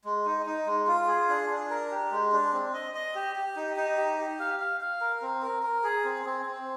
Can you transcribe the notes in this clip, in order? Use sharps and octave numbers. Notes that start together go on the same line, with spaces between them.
G#3
D#4
D#4
G#3
F4
G#4
D4
D4
A#4
G4
G#3
D4
C4
D#5
D#5
G4
G4
D#4
D#4
G4
G4
F5
F5
F5
A#4
C4
A#4
A#4
G#4
C4
C4
C4